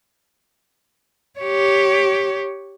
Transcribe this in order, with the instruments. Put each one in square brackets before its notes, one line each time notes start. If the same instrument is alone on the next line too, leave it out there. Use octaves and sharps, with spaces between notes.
[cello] G4 C#5